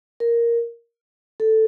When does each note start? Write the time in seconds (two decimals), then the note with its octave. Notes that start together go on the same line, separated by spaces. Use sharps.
0.20 A#4
1.40 A4